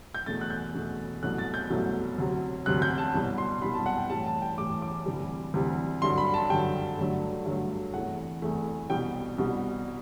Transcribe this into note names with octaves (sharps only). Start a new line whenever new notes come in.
G6
E2 B2 A3 A6
F#6
G6
E2 B2 A3
C2 B2 F#3 A3 F#6
A6
G6
C2 B2 F#3 A3
D2 C3 F#3
D2 C3 F#3 F#6
G6
A5
C2 B2 G3
C6
C2 B2 G3 B5
A5
F#5
G5
A2 E3 G3 A5
A5
G5
A2 E3 G3 D6
D6
D2 C3 E3 G3
D2 C3 E3 G3
G2 D3 F#3 C6
B5
A5
G2 D3 F#3 G5
G2 D3 F#3 A3
G2 D3 F#3 A3
E2 C3 E3 A3 F#5
E2 C3 E3 A3
C2 B2 G3 G5
C2 B2 G3